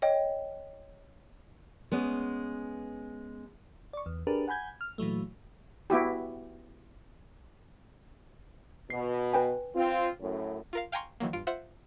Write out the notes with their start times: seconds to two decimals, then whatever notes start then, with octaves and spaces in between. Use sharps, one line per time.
0.02 C#5 D#5 G5
1.92 G#3 B3 C#4
3.93 D5 C#6
4.06 E2
4.27 D4 G4 G#4 A#4 B4
4.48 F#5 G#5 B5 G6 G#6
4.81 F6
4.98 A#2 E3 F#3 A3
5.90 B3 E4 F#4 G4
8.90 B2 C7
9.33 B4 G5 G#5
9.76 C4 F4
10.21 F#2 A2
10.73 F4 A#4 F5
10.92 F5 G5 G#5 A#5 C6 C#6
11.20 D#3 E3 F#3 A#3
11.33 G2 F4 D7
11.47 F4 C5 E5 F#5